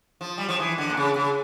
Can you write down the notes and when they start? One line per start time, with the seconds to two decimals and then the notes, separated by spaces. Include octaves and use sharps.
0.21 F3
0.38 G3
0.49 F3
0.59 E3
0.78 D3
0.90 A#2
0.97 C#3
1.16 C#3